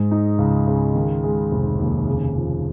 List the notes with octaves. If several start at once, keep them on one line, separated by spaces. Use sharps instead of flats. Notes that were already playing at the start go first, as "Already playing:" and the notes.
Already playing: G#2 G#3
D#4
C#2
C#3
D#3
G#3
F1
D#2
C#3
F3